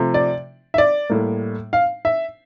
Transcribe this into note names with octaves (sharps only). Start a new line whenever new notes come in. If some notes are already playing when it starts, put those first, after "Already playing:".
Already playing: C3 F3 A3
D5
E5
D5
A2 G3 A#3
F5
E5